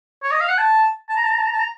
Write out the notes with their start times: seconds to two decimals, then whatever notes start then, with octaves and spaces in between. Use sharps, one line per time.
0.23 C#5
0.32 D#5
0.41 F5
0.49 F#5
0.58 A5
1.09 A5
1.16 A#5
1.24 A5
1.31 A#5
1.38 A5
1.45 A#5
1.53 A5
1.59 A#5